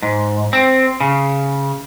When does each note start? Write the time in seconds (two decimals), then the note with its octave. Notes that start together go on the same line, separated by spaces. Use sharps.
0.02 G#2
0.53 C4
1.00 C#3